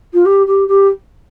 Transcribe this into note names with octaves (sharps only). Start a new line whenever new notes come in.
F4
G4
G4
G4